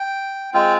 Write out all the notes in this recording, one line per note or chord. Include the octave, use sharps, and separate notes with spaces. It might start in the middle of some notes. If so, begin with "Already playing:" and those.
Already playing: G5
G#3 C4 F4 G5